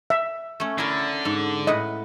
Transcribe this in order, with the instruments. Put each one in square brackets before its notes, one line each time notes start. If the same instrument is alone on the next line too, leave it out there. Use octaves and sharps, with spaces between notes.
[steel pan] E5
[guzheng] A3 C#4
[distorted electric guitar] D3 [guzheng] E4 A4 A#4
[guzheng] G#2
[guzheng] A2 B4 F#5 [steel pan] D#5